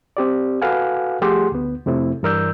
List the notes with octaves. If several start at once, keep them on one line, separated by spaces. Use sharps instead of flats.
C4 G4 D5
F#4 A4 B4 F5 F#5 G#5
F3 A3 G4 G#4 F#5 C6
D2 B3
F2 C3 A3 C4 E4
G2 E3 A#4 D5 E6 G6